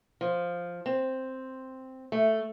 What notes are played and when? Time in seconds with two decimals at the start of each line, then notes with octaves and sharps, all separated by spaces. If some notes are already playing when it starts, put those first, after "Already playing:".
0.21 F3
0.86 C4
2.12 A3